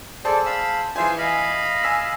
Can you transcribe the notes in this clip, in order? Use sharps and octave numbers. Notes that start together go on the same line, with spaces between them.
G#4 A4 C5 D5 A5
F5 B5 E6
E3 F4 G#4 C5 E5 G#5
D#5 F5 B5
G#5 E6 B6